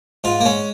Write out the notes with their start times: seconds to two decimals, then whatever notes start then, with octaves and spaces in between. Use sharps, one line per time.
0.24 G#2 F4
0.40 A#3
0.45 G#3 C#4